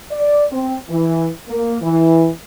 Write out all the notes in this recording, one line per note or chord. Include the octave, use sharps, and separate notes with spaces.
D5
C4
E3
A#3
E3